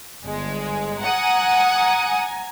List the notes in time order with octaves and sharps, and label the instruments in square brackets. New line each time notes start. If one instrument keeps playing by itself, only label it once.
[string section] G1 G#3
[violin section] F#5 D#6 [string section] G#5 A#5